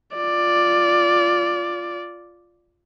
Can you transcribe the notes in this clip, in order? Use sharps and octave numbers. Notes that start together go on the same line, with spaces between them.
F4 D5